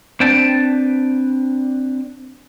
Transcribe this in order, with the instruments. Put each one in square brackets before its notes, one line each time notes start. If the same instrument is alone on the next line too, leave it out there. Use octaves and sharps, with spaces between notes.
[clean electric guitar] C4 D4 B4 G5 A5